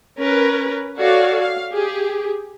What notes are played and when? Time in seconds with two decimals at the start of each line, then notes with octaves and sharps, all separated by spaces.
0.20 C#4 A#4 B4
0.98 F#4 A4 C#5 D5 F5
1.40 F5
1.72 G4 G#4